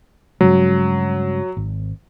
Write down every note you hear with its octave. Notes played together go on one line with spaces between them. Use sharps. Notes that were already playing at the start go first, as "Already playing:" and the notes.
G2 C#3 F#3 G#3
G#1